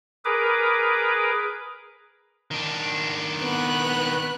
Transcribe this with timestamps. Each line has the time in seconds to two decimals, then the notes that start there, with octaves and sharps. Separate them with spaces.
0.25 G#4 A#4 B4 D6
2.51 D#3 D4
3.42 B3 F#6